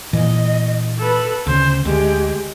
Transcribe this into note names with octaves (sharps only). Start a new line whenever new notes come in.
A#2 E3 D#5
A4 B4
D2 C#3 C5
D2 G#3 G4